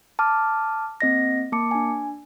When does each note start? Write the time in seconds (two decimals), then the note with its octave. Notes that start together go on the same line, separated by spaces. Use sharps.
0.19 A5 D6 F6
1.01 A#3 C4 D#5 A#6
1.52 A#3 A5 D6 C#7
1.71 D4 G#5